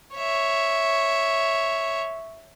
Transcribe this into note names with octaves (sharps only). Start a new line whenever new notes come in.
C#5 E5